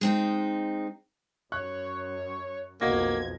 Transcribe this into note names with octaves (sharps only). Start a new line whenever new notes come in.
G#3 C4 D#4
F#2 C#5 F#6
B1 F2 A#3 F#4 D#5 G#6 A#6